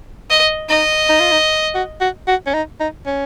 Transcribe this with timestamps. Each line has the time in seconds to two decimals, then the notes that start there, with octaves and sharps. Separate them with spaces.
0.30 D#5
0.70 D#4 D#5
1.09 D#4
1.20 F4
1.32 D#4
1.75 F#4
2.01 F#4
2.27 F#4
2.46 C#4
2.54 D#4
2.80 D#4
3.06 C#4